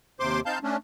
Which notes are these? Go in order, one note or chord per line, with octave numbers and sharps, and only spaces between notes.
D#2 C3 C5 C6 D6
C4 D#4 F5 A5 G6
A3 C#4 D4